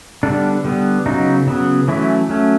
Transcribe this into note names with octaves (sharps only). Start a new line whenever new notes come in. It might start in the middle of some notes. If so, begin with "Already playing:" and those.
D3 G3 B3 D4
D3 G3 B3
C#3 F#3 B3 D#4
C#3 F#3 B3
E3 F#3 A3 C#4 E4
F#3 A3 C#4